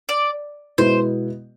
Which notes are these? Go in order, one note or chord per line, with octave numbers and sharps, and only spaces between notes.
D5
B2 G#3 B3 E4 C5